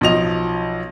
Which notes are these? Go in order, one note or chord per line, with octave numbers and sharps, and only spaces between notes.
B1 F3 D#5 F7